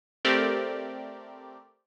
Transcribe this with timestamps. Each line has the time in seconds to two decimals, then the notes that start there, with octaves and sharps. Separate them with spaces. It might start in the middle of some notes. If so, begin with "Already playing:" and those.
0.25 A3 C4 G4 A#4 D5